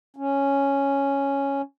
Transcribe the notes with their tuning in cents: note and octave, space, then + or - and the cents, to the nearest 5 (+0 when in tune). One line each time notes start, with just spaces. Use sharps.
C#4 +0